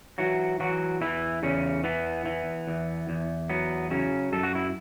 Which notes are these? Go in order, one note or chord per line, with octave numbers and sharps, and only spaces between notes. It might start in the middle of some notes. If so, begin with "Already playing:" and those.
E3 F#3 F#4
E3 F#3 F#4
E2 E3 E4
E2 C#3 C#4
E3 B3
E3
E2
E2
F#3 B3
C#3 F#3 C#4
F#2 A4
F#4
E4